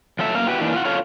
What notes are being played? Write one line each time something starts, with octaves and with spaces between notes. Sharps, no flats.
F3 F#3 A4 E5
F#2 A#3 F5
B3 E4 F#4 G4 B4
E3 A#3 D4 D#4
F4 F#5
F4 A4 C#5 F5